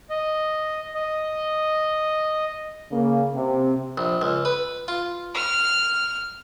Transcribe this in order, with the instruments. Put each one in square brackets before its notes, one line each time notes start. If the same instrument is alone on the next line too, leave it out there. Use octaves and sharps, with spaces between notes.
[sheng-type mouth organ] D#5
D#5
[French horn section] C#3 A#3
C3
[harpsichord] A#1
C#2
B4
F4
[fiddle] F6